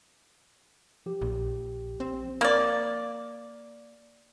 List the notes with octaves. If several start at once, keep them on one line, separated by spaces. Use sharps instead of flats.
F3 G4
A#1
C4
A#3 D5